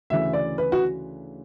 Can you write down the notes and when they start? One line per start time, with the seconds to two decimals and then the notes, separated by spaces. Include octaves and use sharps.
0.10 D2 C#3 E3 E5
0.33 D5
0.58 B4
0.72 F#4